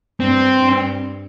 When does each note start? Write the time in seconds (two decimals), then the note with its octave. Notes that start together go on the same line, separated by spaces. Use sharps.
0.20 G2 C4
0.59 G2